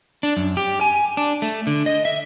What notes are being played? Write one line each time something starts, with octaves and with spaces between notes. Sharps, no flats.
D4
F#2
G4
G#5
D4
A3
D3
D#5
E5